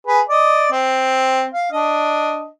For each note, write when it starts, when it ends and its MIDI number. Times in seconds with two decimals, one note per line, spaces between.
0.07 0.21 68
0.07 0.21 71
0.29 0.71 74
0.29 0.71 75
0.71 1.45 60
1.54 1.68 77
1.72 2.48 62
1.72 2.48 75